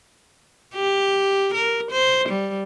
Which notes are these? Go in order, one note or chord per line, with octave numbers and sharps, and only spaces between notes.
G4
A#4
C5
G3